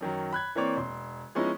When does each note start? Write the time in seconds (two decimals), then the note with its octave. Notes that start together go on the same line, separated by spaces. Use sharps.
0.01 F#2 D#3 F#3
0.33 B5 F#6 G#6
0.55 E3 A#3 C4 C#5 D5
0.77 E1 C6
1.35 F3 G#3 B3 C#4 D#4 E4